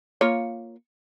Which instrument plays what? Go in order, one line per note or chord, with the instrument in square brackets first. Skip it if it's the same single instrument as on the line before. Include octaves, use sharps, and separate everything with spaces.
[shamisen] A#3 F4 C#5